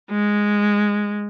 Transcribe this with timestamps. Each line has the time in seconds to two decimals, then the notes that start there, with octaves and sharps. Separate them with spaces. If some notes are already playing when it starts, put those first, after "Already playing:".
0.10 G#3